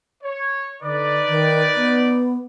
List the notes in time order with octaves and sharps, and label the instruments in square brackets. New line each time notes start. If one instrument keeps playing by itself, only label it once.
[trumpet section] C#5
[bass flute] D3 [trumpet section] D#4 B4 D5
[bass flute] D#3
B3